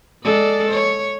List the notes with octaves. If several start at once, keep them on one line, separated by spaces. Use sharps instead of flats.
G#3 A4 D5
C#5